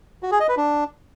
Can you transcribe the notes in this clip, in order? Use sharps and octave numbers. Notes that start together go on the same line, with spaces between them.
F#4
G#4
D#5
B4
D4